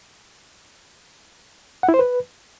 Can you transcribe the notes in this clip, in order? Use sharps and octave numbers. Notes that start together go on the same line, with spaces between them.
F#5
E4
C5
B4